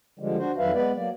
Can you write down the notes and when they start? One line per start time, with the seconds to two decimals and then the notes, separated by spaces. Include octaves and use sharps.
0.19 D3 F3 G3 G#3
0.38 D4 F#4 C5
0.58 F2 D#3 F#3 B4 E5 F5
0.73 G#3 B3 B4 D5
0.96 F#3 A#3 D5